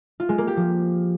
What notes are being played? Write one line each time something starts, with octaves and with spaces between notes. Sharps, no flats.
F4
G#3
A#3
G4
F3